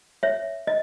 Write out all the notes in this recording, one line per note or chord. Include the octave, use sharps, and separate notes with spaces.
C#5 E5
D#5